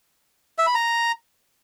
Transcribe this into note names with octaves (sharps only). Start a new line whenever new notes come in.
E5
B5
A#5